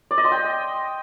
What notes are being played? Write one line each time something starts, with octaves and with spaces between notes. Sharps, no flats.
D5
D#5
C6
G5